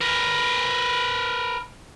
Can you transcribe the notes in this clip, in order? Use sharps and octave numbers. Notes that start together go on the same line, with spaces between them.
A#4 B4